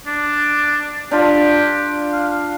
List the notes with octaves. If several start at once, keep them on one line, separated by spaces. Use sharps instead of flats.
D4
D4 F4 G4
F5